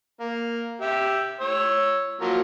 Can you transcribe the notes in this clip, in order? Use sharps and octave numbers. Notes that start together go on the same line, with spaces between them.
A#3
G4 E5
C#5 E6
F3 F#3 A#3